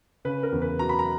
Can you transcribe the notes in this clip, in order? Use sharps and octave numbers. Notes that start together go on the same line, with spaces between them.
C#3 B4
A#4
E2
B4
F#3 A#5
B5
A#5